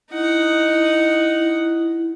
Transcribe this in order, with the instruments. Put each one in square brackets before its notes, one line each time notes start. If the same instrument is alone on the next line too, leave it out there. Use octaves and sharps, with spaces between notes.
[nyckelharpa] D#4 F#5 [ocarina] E4